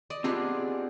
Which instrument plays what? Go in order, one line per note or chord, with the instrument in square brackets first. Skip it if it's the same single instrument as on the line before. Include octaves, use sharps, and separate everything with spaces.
[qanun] D5 D#5
[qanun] B3 D4 F4 [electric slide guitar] C4 G4 G#4